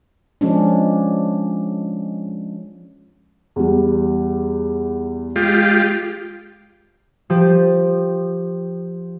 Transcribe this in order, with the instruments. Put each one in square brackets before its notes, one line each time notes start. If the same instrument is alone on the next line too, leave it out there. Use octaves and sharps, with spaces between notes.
[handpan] F3 G#3 C#4 D4
[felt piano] E2 G3
[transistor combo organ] G#3 F4 G4
[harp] F3 G4